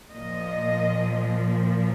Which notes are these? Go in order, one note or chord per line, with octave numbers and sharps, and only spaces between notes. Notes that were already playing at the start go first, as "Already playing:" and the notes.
A#2 F3 D#5